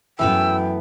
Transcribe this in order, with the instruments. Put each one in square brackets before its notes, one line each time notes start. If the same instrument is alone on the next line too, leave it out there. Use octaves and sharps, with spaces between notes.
[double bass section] F#2 [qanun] E3 A3 B3 [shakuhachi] G5 [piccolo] E6